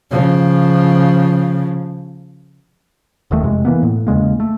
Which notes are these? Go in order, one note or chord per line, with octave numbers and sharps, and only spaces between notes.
C#3 F3
D#1 D#2 D#3 A3
F2 C3 G#3
E3 A#3 B3
A2
E2 C#3 G#3 A#3
A3